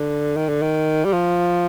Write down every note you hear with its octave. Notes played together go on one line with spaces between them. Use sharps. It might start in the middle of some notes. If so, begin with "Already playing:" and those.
Already playing: D3
D#3
D3
D#3
G3
F3